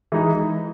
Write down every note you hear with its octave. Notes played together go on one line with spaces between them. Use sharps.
E3 G#3 D#4